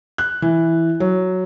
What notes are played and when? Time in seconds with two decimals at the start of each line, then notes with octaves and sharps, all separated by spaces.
0.18 F#6
0.42 E3
1.00 F#3